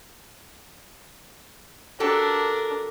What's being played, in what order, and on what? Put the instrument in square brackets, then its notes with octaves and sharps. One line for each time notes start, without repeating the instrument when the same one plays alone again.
[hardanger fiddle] D4 A#4 [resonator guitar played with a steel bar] F#4 G4 A4